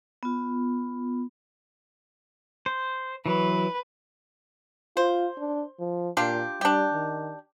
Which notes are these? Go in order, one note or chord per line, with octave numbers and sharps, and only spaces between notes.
B3 F4
C5
E3 F#3 B4
F4 C5
D4
F3
A#2 D4 F4 G4
G3 D4 G4
D#3